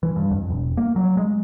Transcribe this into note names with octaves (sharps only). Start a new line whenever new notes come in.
E3
G2
F2
E1
A#3
F#3
G#3